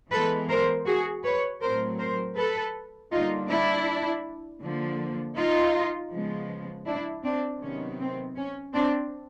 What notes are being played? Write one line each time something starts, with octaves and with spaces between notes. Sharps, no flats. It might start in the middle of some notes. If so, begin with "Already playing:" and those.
E3 G#3 B3 A4 B4
A#4 C5
F#4 G#4
B4 C#5
A2 F#3 A3 C4 A#4 C5
A#4 C5
A4 B4
D3 G3 A#3 D#4 F4
D4 E4
D3 F3 A#3
D#4 F4
C#3 F3 G#3 B3
D4 E4
C4 D4
C3 D#3 F#3 B3 C#4
C4
C#4
C4 D4